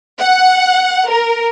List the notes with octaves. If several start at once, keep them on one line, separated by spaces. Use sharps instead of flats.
F#5
A#4